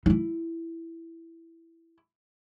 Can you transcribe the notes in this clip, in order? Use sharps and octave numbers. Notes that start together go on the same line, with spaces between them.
D#4 E4